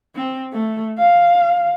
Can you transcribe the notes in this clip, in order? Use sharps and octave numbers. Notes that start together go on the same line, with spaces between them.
C4
A3
F5